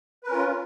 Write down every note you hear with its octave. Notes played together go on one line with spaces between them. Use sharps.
C#4 F4 A#4 B4